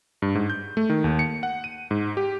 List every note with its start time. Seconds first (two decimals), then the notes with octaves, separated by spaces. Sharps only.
0.22 G2
0.35 G#2
0.50 G6
0.77 A3
0.90 D#3
1.04 D#2
1.19 C#7
1.43 F#5
1.64 D#7
1.91 G#2
2.17 G4